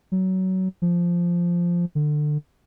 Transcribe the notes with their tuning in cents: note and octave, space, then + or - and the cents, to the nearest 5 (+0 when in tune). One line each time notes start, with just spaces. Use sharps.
F#3 +20
F3 -5
D3 +25